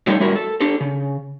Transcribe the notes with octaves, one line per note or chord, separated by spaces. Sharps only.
F#3 G3 A3 D#4 A4 C#5
A2 G3 E4 F#4 A#4
A4
D4 G4 A4
C#3